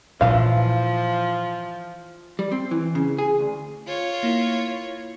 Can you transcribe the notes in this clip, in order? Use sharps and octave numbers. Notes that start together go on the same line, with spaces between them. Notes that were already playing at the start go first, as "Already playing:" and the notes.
A#2 E3 F3 F4 F5
G3
C4
E3
C#3
G#4
D2
F4 C#5
A#3 E4